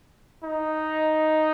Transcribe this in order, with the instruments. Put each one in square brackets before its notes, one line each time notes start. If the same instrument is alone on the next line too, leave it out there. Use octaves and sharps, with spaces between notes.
[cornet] D#4